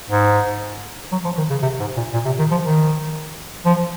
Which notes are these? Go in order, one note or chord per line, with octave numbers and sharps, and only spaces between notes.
G#2
F#3
F3
D#3
C#3
C3
G#2
A#2
A#2
C3
D#3
F3
D#3
F3